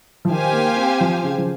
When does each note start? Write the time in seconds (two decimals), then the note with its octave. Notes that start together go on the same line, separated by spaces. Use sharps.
0.25 F3
0.30 D#3 G4 C5 F5 G#5
0.53 A#3
0.76 C4
1.01 F3
1.23 C#3
1.38 F3